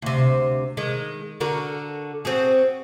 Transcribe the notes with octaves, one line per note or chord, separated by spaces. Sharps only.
D2 C3
D#3 G#3
D3 F#4 A#4
C4 F#4 G#4